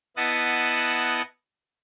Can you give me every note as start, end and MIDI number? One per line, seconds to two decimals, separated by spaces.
0.17 1.22 59
0.17 1.22 64
0.17 1.22 75
0.17 1.22 78
0.17 1.22 81